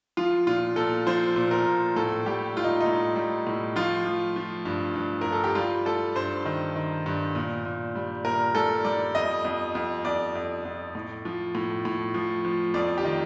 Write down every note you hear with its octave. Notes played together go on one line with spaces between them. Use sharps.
F3 F4
A#2 F4
A#2 A4
F3 C5
A#2
A#4
A#2
A2 A4
G3 G4
G3 F4
D#4
D#4
A2
G3
A2
F3 F4
F3
F3
G2
G2
G2 A#4
A4
G4
G3 F4
G3 A4
G2 C5
D#3
D#3
G2
A#2
A#2
G3
A#2 A#4
G3 A4
G3 D5
F2 D#5
F2
F2
F2 D5
F2
F2
A2
F3
A2
A2
F3
F3
F2 D5
G4
D#3